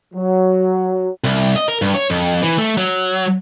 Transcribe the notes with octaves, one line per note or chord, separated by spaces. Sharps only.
F#3
C2
D#5
A#4
G2
C#5
F2
E3
A3
F#3